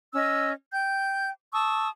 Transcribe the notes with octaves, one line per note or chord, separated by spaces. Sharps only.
C#4 D#5 E6
G5 G6
A5 C#6 D#6 E6